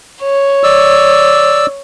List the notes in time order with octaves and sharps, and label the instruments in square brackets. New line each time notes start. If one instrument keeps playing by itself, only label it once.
[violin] C#5
[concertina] D5 E6